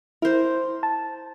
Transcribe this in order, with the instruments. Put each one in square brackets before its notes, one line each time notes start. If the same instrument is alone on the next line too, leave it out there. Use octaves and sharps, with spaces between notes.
[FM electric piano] E4 [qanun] A#4 C5
[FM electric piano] A5